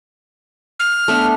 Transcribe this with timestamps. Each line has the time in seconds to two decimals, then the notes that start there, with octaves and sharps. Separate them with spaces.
0.80 F6
1.08 A3 B3 D4